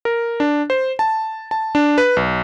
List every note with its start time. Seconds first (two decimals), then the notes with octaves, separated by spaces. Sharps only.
0.05 A#4
0.40 D4
0.70 C5
0.99 A5
1.51 A5
1.75 D4
1.98 B4
2.17 B1